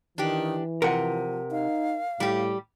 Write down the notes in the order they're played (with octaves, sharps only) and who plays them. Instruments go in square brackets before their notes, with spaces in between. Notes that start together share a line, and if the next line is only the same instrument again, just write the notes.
[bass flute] D#3 [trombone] E3 [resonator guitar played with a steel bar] D4 G4
[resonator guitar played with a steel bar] C3 [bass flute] F3 [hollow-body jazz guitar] A#4 F#5
[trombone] D#4 [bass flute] F5
[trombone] A2 [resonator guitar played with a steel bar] G3 G4